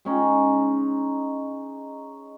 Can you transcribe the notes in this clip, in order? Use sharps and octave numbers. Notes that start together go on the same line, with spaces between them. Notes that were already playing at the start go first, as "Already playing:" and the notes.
G#3 C#4 D#4